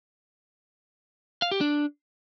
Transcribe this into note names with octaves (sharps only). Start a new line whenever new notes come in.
F5
G4
D4